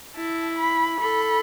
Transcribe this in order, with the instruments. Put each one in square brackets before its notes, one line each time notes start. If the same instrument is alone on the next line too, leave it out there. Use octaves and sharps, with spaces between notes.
[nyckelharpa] E4 [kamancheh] A5
[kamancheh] B5
[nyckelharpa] A4 [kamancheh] B5